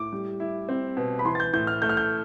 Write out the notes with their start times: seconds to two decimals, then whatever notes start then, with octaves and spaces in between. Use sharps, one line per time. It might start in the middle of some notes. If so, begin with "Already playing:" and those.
Already playing: A2 D6
0.13 G3
0.40 E4
0.69 C4
0.97 B2
1.19 B5
1.25 E3 C6
1.35 A6
1.40 G6
1.53 A2 G6
1.67 F6
1.82 A3 G6
1.89 F6
1.97 G6